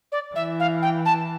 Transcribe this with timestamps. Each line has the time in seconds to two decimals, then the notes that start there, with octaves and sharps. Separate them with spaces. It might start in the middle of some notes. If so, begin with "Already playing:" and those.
0.12 D5
0.35 E3 E5
0.60 F5
0.82 G5
1.06 A5